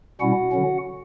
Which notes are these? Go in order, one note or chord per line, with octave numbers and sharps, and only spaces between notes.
B2 G3 C#4 E4 F#4 F#5
D3 F#3 C#4